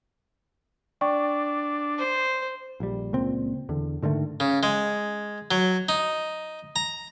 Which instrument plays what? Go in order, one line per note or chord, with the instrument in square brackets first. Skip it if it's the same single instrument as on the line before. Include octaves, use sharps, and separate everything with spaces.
[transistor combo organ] D4 [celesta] D5 G5 C#6
[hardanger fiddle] C5
[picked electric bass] A#1 G3
C#2 A#2 C4
E2 D3
G#2 D3 D#3 A3
[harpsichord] C#3
G#3
F#3
D#4
A#5